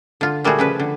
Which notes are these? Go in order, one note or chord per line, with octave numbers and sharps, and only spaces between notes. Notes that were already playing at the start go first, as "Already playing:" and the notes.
D3 F4
A#2 G3 A3 F#4 G#4
C#3 F3 B4
D3